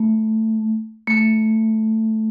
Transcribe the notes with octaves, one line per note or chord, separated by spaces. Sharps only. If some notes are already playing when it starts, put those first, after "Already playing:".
Already playing: A3
A3